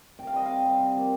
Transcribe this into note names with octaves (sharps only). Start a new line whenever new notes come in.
C3 G5
F5
G3 C4 D#5
C3 F5
G3 C4
C3
F3 A#3